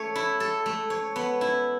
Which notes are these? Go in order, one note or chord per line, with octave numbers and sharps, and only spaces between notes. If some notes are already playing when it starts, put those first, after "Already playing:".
Already playing: A3 C#5
E4
A4
A3
C#5
B3
E4